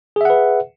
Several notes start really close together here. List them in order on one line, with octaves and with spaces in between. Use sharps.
G#4 E5 F#5 B4